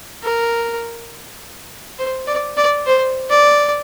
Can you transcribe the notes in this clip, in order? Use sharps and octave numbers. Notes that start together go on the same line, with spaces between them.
A#4
C5
D5
D5
C5
D5